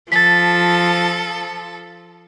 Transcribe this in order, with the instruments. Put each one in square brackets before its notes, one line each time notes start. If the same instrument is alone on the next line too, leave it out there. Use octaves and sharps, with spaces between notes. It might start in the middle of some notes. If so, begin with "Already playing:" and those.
[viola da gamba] F3 [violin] A4 [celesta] A6 B6